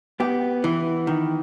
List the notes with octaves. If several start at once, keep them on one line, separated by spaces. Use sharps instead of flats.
B3 G4
E3
D#3